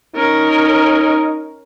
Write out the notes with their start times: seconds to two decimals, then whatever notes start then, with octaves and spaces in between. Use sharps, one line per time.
0.15 C#4 D#4 A#4